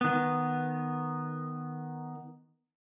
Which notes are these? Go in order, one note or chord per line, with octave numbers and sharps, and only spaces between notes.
D#3 B3